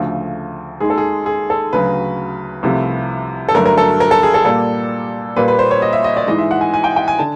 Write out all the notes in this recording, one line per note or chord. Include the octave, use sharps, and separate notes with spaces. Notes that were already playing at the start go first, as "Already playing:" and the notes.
Already playing: D2 C#3 F3 A3
D#2 D#3 G#3 G#4
A4
G#4
G#4
A4
D2 C#3 F#3 B4
C2 C3 F3 A3
A4
G2 D3 F#3 A3 A#4
A#4
A4
A#4
A4
G#4
A4
A#2 G3 A#3 A4
A#2 G3 A#3 B4
B4
C5
C#5
D#5
E5
D#5
D5
G#2 E3 G#3 D#5
E5
F#5
G#5
G#5
G5
G5
G#5
D3 A5